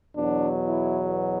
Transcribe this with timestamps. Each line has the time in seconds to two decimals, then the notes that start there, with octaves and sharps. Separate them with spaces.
0.16 E2 B2 F#3 D4
0.65 E4